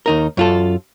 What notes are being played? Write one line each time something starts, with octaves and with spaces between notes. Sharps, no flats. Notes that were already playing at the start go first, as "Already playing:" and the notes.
D#2 D#4 A#4
F#2 F4 A4